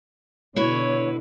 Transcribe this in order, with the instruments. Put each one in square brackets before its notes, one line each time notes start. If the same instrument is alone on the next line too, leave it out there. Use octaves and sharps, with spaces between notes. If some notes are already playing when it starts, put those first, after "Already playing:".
[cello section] B2 D3 [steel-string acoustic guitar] E4 F#4 B4 [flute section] C#5